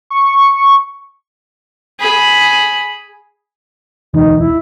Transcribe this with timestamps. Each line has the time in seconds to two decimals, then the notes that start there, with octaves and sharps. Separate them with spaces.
0.10 C#6
2.00 G#4 B5
4.14 E1 D2 E3 D#4
4.39 E4